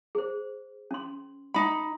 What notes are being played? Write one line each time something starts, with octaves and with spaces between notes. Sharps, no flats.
G#4 C5
C#4 C6
D#4 B5